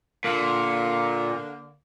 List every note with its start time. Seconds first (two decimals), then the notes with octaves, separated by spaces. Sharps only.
0.24 A#2 D3 A#3